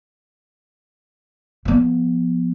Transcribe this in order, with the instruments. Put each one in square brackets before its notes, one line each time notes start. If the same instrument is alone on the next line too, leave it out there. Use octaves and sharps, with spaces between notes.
[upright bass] F3 B3